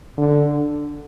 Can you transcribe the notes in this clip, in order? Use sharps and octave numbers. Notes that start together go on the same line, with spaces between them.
D3